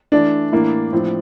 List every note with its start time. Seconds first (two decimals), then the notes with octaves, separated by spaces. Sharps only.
0.12 E3 A3 D4 D5
0.52 A2 E3 A#3
0.93 A2 F3 C4